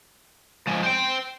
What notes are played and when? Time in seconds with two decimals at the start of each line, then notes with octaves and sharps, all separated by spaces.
0.67 F3 G#3
0.83 C5 G5